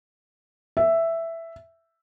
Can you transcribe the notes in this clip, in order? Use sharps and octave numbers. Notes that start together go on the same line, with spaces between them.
E5